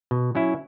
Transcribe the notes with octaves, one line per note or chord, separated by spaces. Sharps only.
B2
F#3 C#4 E4